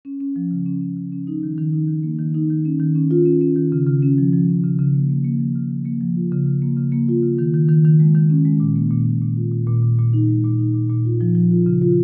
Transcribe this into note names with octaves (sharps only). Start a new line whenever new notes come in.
C#4
C#4
F3
C#3
C#4
C#4
C#3
C#4
D#4
D#3
D#3
D#4
D#3
A#3
D#3
D#4
D#3
C#4
D#3
C#4
F4
C#4
C#4
D#3
C#3
C#3
C#4
F3
F3
C#4
C#3
C#3
A#3
A#3
A#3
F3
C#3
F3
A#3
F3
F4
C#3
C#3
A#3
C#3
A#3
F4
C#3
D#3
D#3
D#3
D#3
G#3
D#3
C#4
G#3
A#2
A#3
A#2
A#2
A#2
F4
A#2
A#2
A#2
A#2
D#4
G#3
A#2
D#4
A#2
A#2
F4
F3
F3
F4
C#3
F4